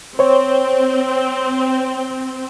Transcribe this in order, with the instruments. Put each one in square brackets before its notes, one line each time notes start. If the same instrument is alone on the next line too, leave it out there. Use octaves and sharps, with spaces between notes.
[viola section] C4 [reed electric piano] C5 C#5